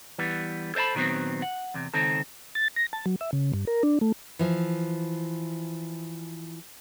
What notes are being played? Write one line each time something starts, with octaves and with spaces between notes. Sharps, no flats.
E3 G3 B3
A4 C5 D5 A5 B5
A#2 D#3 F#3 B3 C4
F#5
E2 C3
C#2 D#3 C4 A4
A6
A#6
A5
F#3
E5
C#3
G2
A#4
D4
A3
E3 F3